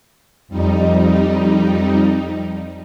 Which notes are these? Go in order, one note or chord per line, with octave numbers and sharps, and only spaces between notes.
F2 G3 D#4